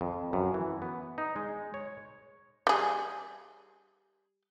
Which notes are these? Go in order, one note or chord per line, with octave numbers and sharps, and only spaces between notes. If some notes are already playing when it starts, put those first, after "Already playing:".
F2
F#2
E3
B3
D#4
G#3
C#5
G3 G#4